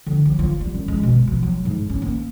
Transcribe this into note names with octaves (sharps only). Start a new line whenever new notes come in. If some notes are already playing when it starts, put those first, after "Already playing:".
D3
F#3
F4
G3
F#2
G#3
B2
F#3
F#3
G#2
C#4
A#3